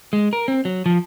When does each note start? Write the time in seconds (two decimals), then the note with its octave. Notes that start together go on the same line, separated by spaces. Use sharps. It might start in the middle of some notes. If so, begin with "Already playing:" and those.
0.13 G#3
0.33 A#4
0.48 C4
0.65 F#3
0.86 F3